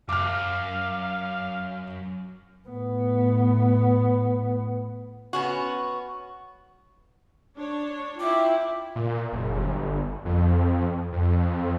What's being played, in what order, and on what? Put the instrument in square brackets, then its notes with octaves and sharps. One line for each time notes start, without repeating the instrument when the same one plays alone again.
[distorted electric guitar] F#2 [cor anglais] F5 [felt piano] D6 F6
[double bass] A2 B3
[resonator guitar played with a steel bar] B3 C#4 F#4
[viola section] D4 C#5
[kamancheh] E4 G5 [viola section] F4 E5 [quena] D6
[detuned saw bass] A#2
F#1
G1
F2
F2